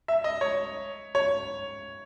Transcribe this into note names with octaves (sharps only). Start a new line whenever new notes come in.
E5
D#5
C#5
C#5